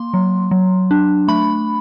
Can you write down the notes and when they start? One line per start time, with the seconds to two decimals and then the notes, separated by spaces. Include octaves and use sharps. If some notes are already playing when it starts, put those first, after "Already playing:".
Already playing: A#3 C6
0.14 F#3
0.51 F#3
0.91 D4
1.28 A3 B5